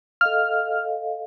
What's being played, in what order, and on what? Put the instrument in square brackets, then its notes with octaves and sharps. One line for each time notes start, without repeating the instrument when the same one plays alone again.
[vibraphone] A4 D#5 F5 [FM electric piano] F6